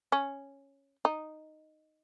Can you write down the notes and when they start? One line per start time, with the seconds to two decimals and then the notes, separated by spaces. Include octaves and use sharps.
0.12 C#4
1.05 D#4